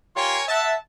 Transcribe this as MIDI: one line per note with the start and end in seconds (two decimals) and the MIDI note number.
0.16 0.39 65
0.16 0.39 67
0.16 0.43 70
0.16 0.43 73
0.16 0.43 80
0.16 0.39 84
0.49 0.76 76
0.49 0.73 78
0.49 0.73 81